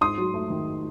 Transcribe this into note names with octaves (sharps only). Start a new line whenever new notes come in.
G#2 C6 D#6
F#3
A3
D#3